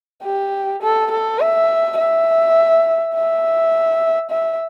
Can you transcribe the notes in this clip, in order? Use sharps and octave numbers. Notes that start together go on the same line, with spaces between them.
G4
A4
A4
E5
E5
E5
E5